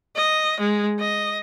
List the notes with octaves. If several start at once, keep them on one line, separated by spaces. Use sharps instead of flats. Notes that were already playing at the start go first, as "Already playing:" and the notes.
D#5
G#3
D#5